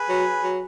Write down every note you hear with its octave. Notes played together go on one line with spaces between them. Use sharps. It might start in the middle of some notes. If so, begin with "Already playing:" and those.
Already playing: G#4 B4
F#3
F#3